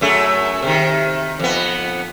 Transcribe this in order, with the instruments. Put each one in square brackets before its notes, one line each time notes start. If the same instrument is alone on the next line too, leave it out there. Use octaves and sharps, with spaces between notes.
[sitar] F#2 A3 G#4
C3 D#3
F2 B3